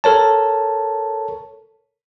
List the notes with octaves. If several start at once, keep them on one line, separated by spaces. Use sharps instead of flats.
A4 A#4 C#5 A5